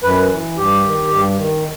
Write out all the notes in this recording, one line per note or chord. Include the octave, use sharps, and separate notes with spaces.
F#2 B4
E3
G2 G4
D#3
G2
D#3